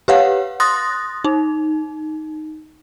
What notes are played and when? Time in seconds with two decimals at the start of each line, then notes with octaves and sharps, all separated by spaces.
0.08 G4 B4 C#5 F5 F#5
0.60 C6 D#6 F#6 A6 A#6
1.25 D#4